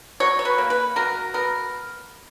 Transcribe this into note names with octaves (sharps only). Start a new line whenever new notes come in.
F#3 C#5
C#5
B4
A#3
B4
F#3 A#4
B3 A#4